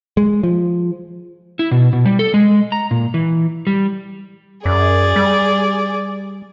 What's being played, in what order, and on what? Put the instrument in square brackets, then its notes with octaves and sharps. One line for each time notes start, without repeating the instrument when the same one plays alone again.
[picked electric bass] G#3
F3
[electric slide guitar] E4
B2
B2
G3
A4
G#3
A#5
A#2
E3
G3
[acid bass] F#2 [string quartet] G#4 D5
[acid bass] G3